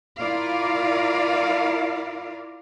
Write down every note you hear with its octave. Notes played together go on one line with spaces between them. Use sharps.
E4 F4 A#4 D5 F5